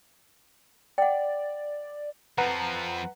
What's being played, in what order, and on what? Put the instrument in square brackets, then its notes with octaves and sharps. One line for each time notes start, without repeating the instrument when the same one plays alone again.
[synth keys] D5 [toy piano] F#5 G5
[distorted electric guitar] F2 F3 [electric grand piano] B4 F#5 A#5